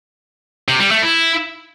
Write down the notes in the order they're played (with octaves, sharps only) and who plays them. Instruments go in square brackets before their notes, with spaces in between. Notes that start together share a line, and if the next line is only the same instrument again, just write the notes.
[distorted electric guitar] C3
G3
A3
E4